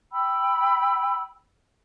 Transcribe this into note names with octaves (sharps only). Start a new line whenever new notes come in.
G5 B5 E6